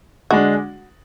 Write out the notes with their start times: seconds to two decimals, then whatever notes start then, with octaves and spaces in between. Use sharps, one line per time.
0.30 D3 G#3 D4 F#4